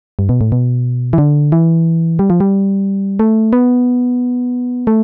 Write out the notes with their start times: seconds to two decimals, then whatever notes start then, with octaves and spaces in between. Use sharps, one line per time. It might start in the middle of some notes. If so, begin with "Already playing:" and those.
0.19 G2
0.29 B2
0.41 A2
0.52 B2
1.13 E3
1.18 D3
1.52 E3
2.19 G3
2.30 F3
2.40 G3
3.19 A3
3.53 B3
4.87 A3